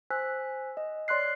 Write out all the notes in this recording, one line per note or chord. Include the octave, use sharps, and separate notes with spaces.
C5 G#5 E6 F#6 B6
D#5
C#5 D5 C6 F6 F#6 C7